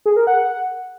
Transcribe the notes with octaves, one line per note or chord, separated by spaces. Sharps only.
G#4
A#4
F#5